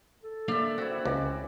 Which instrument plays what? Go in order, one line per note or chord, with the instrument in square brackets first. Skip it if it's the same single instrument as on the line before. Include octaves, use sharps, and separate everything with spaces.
[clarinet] A4
[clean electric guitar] A#3 D4 D#4 [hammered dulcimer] D5 E5 [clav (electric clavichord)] F5
[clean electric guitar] C4 [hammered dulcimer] E4 F#4
[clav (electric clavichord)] C#2 [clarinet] C#4 [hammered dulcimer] D5